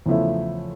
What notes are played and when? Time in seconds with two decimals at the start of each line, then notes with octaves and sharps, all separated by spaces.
0.06 E2 C#3 F3 A3 E4